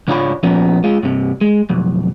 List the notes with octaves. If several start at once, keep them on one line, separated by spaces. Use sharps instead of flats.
C#2 G#2 D4 F4 C#5 B5
A#2 F3 B3 C#4 A#4
G#3 F4
G2 C3
G#3
B1 F2